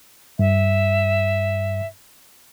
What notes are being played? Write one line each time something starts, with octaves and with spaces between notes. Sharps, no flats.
G2 E5